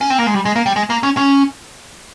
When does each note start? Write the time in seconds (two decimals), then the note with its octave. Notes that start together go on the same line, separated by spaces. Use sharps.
0.01 C#4
0.10 C4
0.18 A#3
0.27 G#3
0.34 G3
0.45 G#3
0.56 A#3
0.66 G3
0.76 G#3
0.90 A#3
1.03 C#4
1.17 C#4